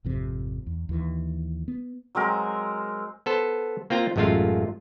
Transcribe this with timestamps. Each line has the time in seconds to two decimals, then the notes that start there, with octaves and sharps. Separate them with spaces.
0.04 G#1 F2 C3
0.67 E2
0.89 D#2 E3
1.68 B3
2.15 F#3 G#3 C4 A#4
3.26 B3 A4 C5
3.90 A#3 C4 F4 G5 A#5
4.16 A1 F#2 G#3 A3 F4 F5